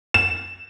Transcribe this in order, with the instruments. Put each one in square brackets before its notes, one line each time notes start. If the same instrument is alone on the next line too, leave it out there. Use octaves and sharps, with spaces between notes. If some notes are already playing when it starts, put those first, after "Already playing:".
[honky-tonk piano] E7